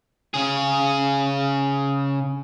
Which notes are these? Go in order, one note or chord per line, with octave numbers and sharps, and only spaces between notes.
C#3 G#4